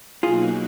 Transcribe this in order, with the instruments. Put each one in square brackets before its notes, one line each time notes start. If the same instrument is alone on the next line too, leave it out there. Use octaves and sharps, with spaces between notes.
[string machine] B2 F#3 A#3 D#4 F#4 [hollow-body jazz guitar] F4 G#4